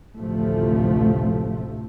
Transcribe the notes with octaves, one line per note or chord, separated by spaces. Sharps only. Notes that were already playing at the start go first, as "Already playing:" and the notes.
A1 D2 C3 F3 A3